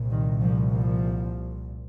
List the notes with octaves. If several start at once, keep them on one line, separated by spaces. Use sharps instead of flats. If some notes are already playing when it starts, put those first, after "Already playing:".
Already playing: C2 A#2
D#3
F3
F3